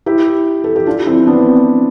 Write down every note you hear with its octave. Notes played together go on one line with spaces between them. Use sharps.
E4 G4
A4
G4
D4 F4
C4 E4
B3 D4